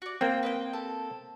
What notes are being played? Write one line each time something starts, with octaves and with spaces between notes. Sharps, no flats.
F#4 D5
A#3 C4 G5
B4 D#5 G5
A4